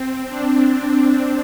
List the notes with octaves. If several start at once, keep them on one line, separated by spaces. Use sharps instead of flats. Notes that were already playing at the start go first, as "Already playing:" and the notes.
Already playing: C4
D4